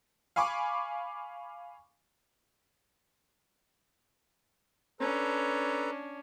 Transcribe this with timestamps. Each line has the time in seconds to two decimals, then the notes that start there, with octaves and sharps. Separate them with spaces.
0.36 F5 G#5 B5 C#6 D6
5.00 C#4 D4 A4 B4 A#5